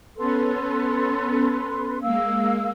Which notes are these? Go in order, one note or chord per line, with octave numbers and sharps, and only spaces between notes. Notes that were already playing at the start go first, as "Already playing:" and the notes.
B3 C#4 A4 B4 C6
G#3 A#3 F5 E6